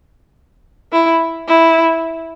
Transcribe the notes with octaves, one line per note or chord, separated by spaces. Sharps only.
E4
E4